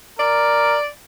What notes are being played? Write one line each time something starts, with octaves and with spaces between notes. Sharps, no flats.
A#4 D5